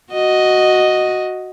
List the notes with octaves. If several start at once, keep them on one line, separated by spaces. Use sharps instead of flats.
F#4 D#5